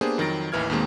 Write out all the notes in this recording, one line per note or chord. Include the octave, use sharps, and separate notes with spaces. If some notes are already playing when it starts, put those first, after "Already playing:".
A#3 B3 D4 G4 G#4 C5
F2 D#3 F#3 A6 A#6 D7
A1 D#2 E3 F6 G#6
D#2 B2 D#3 G#3 A#3 C4